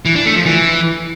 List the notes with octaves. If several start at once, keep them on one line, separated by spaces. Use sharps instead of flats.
E3
D4
A3
F3
E3